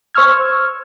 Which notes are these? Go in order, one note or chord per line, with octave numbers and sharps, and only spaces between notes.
C5 C#6 E6 F6 G#6